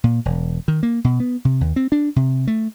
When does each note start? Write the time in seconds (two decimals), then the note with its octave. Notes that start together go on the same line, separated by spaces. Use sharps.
0.04 A#2
0.25 E1
0.68 D#3
0.83 A#3
1.04 B2
1.20 B3
1.45 C3
1.61 D#2
1.76 C4
1.92 D4
2.16 C3
2.47 A3